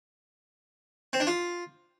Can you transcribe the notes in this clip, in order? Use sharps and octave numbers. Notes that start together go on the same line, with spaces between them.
C4
D4
F4